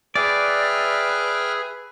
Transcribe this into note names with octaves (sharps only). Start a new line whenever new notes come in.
G#4 B4 D5 E5 G5 F6